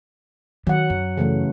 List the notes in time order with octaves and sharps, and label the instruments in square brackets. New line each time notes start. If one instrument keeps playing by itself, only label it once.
[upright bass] D#3 [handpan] F#3 F#5
[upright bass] F#2
[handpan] C#3 E3 A3